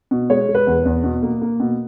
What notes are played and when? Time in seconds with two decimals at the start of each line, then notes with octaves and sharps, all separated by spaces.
0.11 B2
0.30 G#3 C#5
0.49 G#3
0.55 B4
0.67 E2
0.85 E2
1.04 B2
1.23 A#3
1.42 A#3
1.60 B2